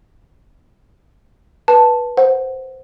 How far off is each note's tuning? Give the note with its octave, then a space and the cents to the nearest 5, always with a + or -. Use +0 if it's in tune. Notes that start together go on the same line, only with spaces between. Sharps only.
B4 -20 A5 +0
C5 +0 F#5 +0